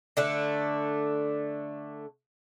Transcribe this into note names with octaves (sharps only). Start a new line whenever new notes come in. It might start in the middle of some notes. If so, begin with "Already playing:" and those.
D3 A3 D4